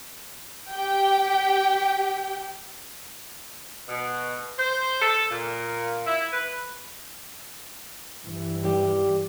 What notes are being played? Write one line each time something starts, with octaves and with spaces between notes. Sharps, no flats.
G4 G5
B2
C5
A4
A#2
E4
B4
G2 E3
D#2 G3 G4